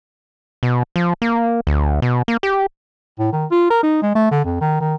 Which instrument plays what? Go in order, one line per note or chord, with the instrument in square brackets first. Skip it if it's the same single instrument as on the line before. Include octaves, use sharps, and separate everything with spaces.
[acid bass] B2
F3
A#3
D2
B2
A#3
G4
[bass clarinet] A2
D#3
F4
A#4
D#4
G#3
A3
D3
F2
D#3
D#3